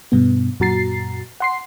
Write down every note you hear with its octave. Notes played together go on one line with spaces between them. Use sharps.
G2 B2 B3
F#2 A#2 F#4 A#5 A6 C7
F#5 C6 C7